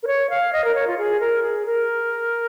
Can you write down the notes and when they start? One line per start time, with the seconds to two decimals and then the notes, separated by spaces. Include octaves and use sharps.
0.03 A#4
0.07 C#5
0.30 F5
0.53 D#5
0.64 A#4
0.75 C#5
0.87 F4
0.98 G#4
1.20 A#4
1.43 G#4
1.66 A#4